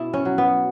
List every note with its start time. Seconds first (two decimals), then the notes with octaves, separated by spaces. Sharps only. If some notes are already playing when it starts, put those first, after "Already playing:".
Already playing: B2 E4
0.13 C#4
0.25 F#3
0.38 B3